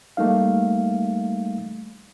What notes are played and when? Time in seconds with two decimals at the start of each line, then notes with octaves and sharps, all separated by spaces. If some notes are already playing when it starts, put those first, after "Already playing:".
0.17 G3 A3 A#3 D#4 F5